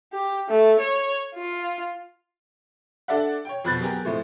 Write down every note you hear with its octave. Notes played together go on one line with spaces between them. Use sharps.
G4
A3
C#5
F4
D4 A4 D5 E5 F#5
C#5 G5
F2 B2 B5 F#6 G6 A6
F#3 B3 G4 G#4 A#4
A2 F3 G#3 A3